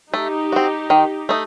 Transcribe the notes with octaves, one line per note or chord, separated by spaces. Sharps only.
A3 D#4 G4
C4 F#4
D#3
A3 D#4